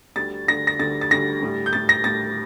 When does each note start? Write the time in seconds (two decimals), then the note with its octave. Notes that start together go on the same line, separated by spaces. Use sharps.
0.16 D2 D3 G3 A6
0.47 D2 D3 G3 A#6
0.67 A#6
0.79 D2 D3 G3 A6
1.01 A6
1.11 D2 D3 G3 A#6
1.42 A2 G3
1.66 G6
1.73 A2 G3 A6
1.89 A#6
2.04 A2 G3 A6